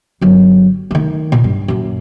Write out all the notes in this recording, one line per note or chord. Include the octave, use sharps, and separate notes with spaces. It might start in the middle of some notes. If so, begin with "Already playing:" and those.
G1 F#3
D#3 A3
A#2
G2
F#2 A#2